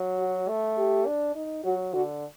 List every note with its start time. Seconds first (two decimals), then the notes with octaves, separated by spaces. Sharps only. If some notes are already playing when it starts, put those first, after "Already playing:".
Already playing: F#3
0.19 F#4
0.48 A3
0.77 G4
1.06 D4
1.35 D#4
1.65 F#3 F#4
1.94 D3 F#4